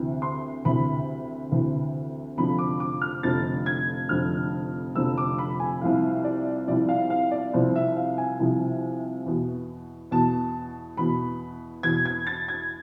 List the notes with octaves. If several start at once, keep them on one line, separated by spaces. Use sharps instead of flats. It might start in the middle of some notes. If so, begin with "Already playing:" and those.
Already playing: D2 C3 E3
C6
D2 C3 E3 B5
D2 C3 E3
F1 F2 D3 F3 B5
D6
D6
F6
F1 F2 D3 F3 A6
G#6
F1 F2 D3 F3 F6
F1 F2 D3 F3 E6
D6
B5
G#5
C2 C3 F3 F5
D5
C2 C3 F3 D5
F5
F5
D5
C2 C3 F3 C5
E5
F5
G#5
C2 C3 F3
E2 B2
E2 B2 A5
E2 B2 B5
E2 B2 G#6
G#6
A6
G#6